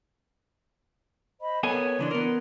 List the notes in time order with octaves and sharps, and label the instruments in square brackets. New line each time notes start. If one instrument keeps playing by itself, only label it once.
[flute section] C5 D#5 B5
[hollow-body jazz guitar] B3 A4 G#5 [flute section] A#4 C#5
[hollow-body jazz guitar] C#3 E3 D4 [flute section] C6
[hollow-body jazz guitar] B3 A#4